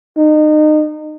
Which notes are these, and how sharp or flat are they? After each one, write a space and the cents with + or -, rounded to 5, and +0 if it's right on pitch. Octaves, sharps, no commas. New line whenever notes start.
D#4 -30